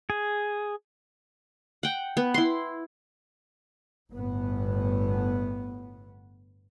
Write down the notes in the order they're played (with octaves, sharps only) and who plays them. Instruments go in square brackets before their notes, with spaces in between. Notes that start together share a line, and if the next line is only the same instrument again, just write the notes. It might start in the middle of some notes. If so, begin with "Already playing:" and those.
[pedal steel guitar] G#4
[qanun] F#5 G5
B3
E4 C6
[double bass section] G1 A2 B3